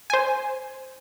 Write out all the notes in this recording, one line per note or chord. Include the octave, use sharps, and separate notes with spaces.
C5 G#5